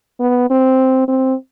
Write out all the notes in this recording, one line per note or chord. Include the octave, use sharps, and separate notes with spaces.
B3
C4
C4